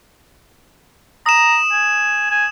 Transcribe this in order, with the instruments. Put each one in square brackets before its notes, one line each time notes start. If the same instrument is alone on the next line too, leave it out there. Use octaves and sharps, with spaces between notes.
[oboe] A#5 [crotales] D#6 E7
[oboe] G#5
G#5